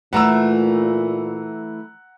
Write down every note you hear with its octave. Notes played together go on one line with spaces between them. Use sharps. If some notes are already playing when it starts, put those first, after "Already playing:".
A#2 E3 A3 F#5 A#5 E6